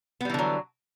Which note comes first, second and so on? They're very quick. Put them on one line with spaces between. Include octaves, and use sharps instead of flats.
B3 G3 E3 D3 F#3